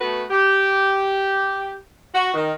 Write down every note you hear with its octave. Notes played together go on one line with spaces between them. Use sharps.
A3 B3 F#4 A4 B4
G4
F#4
D#3